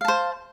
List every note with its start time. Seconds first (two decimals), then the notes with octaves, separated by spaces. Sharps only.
0.01 F5
0.05 A5
0.08 C5